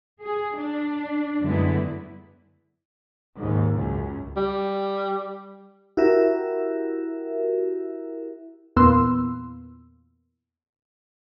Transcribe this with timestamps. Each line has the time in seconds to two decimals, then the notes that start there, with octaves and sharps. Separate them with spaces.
0.23 G#4
0.57 D4
1.43 F#2 D3 G3 G#3 B3 E4
3.38 D#2 G#2
3.77 C#2 F#2
4.36 G3
5.97 E4 F#4 G4 A#4 E5
8.76 E2 A#2 B3 C6 E6